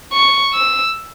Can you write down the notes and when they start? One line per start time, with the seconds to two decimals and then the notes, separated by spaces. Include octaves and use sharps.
0.13 C#6
0.54 E6